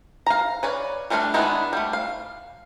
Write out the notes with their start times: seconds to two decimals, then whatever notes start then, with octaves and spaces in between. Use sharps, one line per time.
0.26 F5 A#5
0.63 B4 C#5 D5
1.10 G3 A3 D4 D5 F5
1.34 D#3 G#3 B3 D4 E4
1.73 G3 A3
1.93 F5